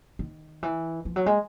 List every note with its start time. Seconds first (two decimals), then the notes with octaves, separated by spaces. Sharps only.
0.19 D#3
0.63 E3
1.05 F3
1.16 F#3
1.26 G#3